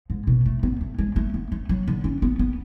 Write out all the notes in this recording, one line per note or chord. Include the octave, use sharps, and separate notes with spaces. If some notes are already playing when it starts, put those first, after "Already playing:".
G#2
B2
A3
B3
A3
G#3
A3
B3
A3
F#3
D3
C#4
B3
B3